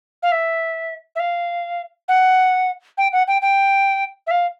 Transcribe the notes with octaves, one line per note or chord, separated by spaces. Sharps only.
F5
E5
E5
F5
F#5
G5
F#5
G5
G5
E5
F5